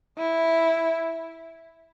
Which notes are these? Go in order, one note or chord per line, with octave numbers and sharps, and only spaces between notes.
E4